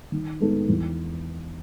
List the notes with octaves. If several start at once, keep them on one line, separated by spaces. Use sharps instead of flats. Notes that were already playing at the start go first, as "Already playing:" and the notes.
D#3
G#3 B3 D#4 A4
E2